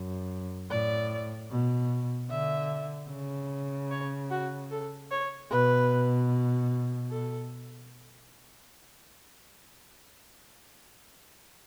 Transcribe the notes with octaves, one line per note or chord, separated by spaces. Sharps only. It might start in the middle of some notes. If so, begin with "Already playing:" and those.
Already playing: F#2
A2 D5
B2
D3 E5
C#3
C#5
F#4
A4
C#5
B2 B4
A4